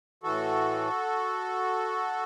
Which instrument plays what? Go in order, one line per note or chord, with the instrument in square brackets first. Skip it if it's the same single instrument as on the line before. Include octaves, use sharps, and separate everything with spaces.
[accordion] A2 E3 F#4 A4